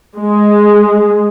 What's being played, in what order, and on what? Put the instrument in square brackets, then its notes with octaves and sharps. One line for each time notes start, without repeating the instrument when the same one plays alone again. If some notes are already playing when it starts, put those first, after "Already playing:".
[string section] G#3